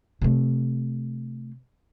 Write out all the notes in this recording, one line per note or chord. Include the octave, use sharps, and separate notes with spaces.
C3 A3